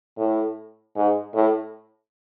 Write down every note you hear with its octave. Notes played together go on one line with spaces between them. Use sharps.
A2
G#2
A2